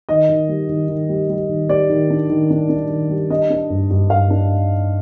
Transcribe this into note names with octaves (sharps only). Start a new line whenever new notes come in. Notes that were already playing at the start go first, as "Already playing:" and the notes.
D#3 D#5
D#3
G3
D#3
D#3
G3
G3
D#3
G3 D5
D#3
D4
D#3
D4
D4
D#3
G3
D4 D#5
D4
G2
G2
G2 F5
D4